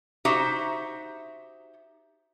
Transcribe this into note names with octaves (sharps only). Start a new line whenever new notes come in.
D#4 F#4 G4 C5 E5